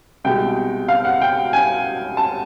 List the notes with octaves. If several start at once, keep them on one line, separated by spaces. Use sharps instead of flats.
C2 B2 G#3 G5
F5
F#5
G5
G#5
A5